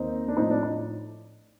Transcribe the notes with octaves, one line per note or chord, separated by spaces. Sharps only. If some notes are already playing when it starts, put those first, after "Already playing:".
Already playing: D#2 D#3 A#3 C4 D#4
D4
A2 F3 A3 C4 D#4
D4
D#4